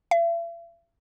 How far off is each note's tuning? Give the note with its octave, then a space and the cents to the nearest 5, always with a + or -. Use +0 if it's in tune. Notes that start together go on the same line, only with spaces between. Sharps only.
E5 +45